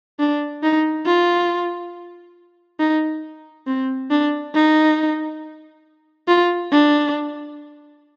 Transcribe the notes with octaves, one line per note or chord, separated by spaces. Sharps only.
D4
D#4
F4
D#4
C4
D4
D#4
F4
D4